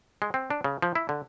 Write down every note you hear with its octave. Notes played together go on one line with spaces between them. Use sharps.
G#3
C4
D4
C#3
F3
E4
D3